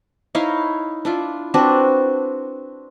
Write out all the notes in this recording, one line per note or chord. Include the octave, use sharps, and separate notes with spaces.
D#4 E4 C#5 F5
D4 E4 F4
C4 D4 F#4 B4